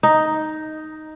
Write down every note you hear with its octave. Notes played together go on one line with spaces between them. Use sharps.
D#4